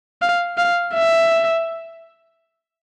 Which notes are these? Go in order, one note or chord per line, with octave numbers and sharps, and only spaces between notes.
F5
F5
E5